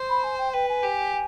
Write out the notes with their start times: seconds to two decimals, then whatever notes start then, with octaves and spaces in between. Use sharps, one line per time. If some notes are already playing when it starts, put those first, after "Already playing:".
Already playing: C5
0.09 B5
0.23 G#5
0.38 G5
0.53 B4 G5
0.69 G#5
0.83 G4